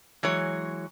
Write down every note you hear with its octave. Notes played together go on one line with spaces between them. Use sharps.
E3 F#3 G#3 C#5